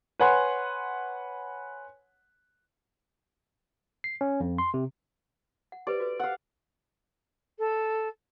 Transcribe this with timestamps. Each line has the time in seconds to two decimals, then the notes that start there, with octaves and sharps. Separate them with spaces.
0.19 B4 C#5 F#5 G#5 C6 F#6
4.04 C7
4.21 C#4
4.40 F2
4.58 C6
4.74 C3
5.72 F#5
5.87 G4 B4 C5 D5
6.00 F#4 A4 B4
6.20 F5 F#5
7.59 A4